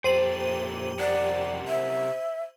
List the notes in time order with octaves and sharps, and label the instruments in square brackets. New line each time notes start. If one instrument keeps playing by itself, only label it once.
[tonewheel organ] F2 G4 [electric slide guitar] A#2 A4 G5 [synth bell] C5 D#7 F#7
[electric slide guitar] C3 A#4 F#5 [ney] D5
[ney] E5